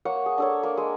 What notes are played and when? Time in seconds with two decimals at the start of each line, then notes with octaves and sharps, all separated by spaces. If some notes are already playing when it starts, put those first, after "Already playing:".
0.05 A#3 C#5 F#5
0.26 G#4
0.38 D4 A4 C#5
0.63 A#3
0.77 G#3